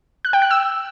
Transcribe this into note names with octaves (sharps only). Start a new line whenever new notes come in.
F#6
G5
F#6
E6